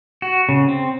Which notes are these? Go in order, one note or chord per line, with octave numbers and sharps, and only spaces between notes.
F#4
C#3
C4